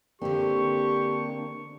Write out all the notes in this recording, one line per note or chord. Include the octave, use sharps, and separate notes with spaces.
D3 A#3 C4 D4 G4 C#6